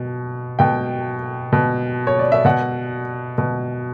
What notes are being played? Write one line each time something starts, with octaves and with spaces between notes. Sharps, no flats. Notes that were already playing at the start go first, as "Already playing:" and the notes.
Already playing: B2
B2 G5
B2
C#5
D5
E5
B2 F#5
B2